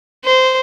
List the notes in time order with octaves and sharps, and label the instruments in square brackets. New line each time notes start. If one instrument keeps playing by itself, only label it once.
[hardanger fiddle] C5